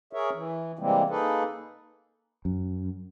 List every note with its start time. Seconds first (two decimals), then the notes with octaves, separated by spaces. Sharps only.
0.13 G#4 A#4 C#5 E5
0.34 E3
0.79 C3 E3 G3 G#3 A#3 C4
1.10 A#3 D#4 G#4 A4 B4
2.45 F#2